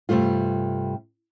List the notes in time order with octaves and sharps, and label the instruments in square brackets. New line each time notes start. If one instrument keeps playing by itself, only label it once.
[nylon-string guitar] G2 C3 G3 A3 F4